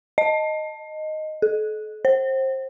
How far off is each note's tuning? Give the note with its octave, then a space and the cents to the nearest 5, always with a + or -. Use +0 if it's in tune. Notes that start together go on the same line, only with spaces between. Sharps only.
D#5 -5
A4 -40
C5 +25